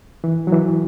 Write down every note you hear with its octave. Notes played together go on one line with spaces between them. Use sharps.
E3
F#3
E3